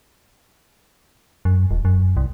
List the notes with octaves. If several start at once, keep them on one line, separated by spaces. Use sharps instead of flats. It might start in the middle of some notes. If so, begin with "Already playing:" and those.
F#2
D#1
F#2
C2